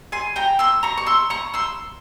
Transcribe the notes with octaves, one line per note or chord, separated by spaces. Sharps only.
G#5 C6
G5 A#5
C6 E6
A#5 C#6
C#6
C6 E6
A#5 C#6
C6 E6